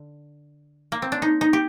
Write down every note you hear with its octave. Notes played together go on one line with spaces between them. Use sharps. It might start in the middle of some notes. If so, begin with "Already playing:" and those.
Already playing: D3
A#3
C4
D4
D#4
D#4
G4